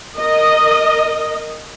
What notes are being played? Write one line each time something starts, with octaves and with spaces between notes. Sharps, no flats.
A#4 D#5